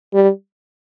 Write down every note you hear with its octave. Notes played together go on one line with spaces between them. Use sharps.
G3